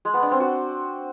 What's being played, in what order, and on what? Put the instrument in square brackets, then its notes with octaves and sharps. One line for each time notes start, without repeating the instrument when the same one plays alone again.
[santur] G#3
B3
D4
C4
F#4